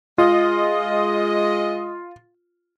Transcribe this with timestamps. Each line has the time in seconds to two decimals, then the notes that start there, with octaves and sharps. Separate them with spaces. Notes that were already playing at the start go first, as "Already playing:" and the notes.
0.18 G#3 F4 D#5